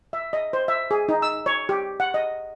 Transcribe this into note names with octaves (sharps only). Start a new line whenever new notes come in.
E5
D#5
C5
E5
G#4
D#4
E6
C#5
G4
F#5
D#5